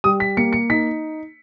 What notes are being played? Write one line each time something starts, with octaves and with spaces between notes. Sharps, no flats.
G3 D#6
B6
A#3 C#7
C#7
D#4 B6